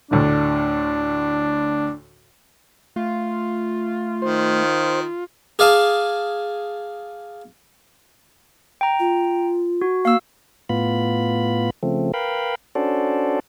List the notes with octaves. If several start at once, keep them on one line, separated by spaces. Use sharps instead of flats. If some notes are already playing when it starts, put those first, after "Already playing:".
D2 A2 D3 D4
A3 F4
D#3 C5
G#4 D5 F5 G#5 A5
G5 A#5
F4
F#4
A#3 F5 E6
A2 B3 F4 B5
C#3 F3 A3 C4
A#4 B4 F5 G5 B5
C#4 D4 F#4 A4 C5 D5